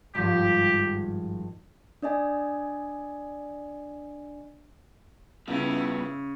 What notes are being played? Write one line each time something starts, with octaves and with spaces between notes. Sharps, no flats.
G#1 G2 F3 G4
D4 D5 D#5 G#5
C#3 G3 B3 E4 F4